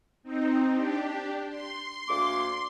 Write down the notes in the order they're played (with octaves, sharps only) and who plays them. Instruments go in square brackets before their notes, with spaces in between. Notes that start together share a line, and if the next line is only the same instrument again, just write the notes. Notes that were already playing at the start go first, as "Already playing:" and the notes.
[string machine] C4 D#4
D4 G4
C6
[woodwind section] D2 A#3 D6